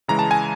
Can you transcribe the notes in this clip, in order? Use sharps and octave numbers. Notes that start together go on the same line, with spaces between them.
C#3 E3 G#3 A#5
A5
G#5